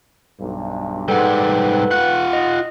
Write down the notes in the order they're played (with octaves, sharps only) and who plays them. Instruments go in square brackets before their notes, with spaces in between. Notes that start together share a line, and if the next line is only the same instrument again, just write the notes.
[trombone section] B1 G2
[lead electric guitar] G#2 G3 [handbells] A4 F#5 [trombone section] B4
[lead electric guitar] F4 F#5 [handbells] F#6
[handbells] D#5